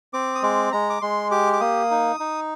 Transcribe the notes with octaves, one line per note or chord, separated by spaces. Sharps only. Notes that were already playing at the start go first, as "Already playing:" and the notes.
C4 D6
D#6
G#3 D6
G#3 A#5
D6
G#3 C6
G4 D6
D6
A#3 D#6
D#4
D#4